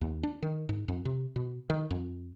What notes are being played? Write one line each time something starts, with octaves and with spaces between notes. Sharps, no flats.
D#2
D4
D#3
G#2
F2
C3
B2
D#3
F2